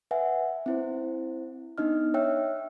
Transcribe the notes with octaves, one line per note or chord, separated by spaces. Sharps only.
B4 E5 F#5 G#5
C4 E4 C5
B3 D4 D#4 D#5 F6
C#5 E5 G5 E6 F#6